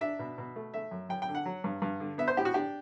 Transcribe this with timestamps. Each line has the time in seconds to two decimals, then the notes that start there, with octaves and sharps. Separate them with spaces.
0.01 D4 E5
0.19 B2
0.38 B2
0.56 A3
0.74 A3 E5
0.91 F#2
1.09 F#2 G5
1.22 G5
1.28 D3
1.35 F#5
1.46 F#3
1.64 G2
1.82 G2
2.00 D3
2.18 B3 E5
2.28 C5
2.37 A2 G4
2.45 F#4
2.54 D4 G4